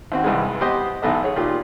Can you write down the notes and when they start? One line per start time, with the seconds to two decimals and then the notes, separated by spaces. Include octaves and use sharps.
0.12 D#2 C4 F#4
0.24 C2 G2 E3 G#3
0.61 B3 G4 C5 D#5
1.02 B1 G#2 E3 B3 A4 D#5
1.24 G#4 C#5
1.36 A#2 D#3 F4 G4